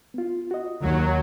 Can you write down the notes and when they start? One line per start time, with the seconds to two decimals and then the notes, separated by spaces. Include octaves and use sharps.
0.14 B3 F4
0.51 F#4 D#5
0.82 D#2 F#3